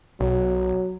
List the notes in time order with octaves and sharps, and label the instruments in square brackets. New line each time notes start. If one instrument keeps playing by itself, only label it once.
[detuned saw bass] B1 [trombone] F#3